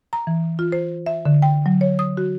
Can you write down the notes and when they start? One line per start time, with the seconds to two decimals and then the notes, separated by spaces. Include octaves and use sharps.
0.13 A#5
0.27 E3
0.59 F4
0.72 C5
1.06 E5
1.25 D3
1.42 G5
1.66 F#3
1.81 C#5
1.99 D#6
2.17 F#4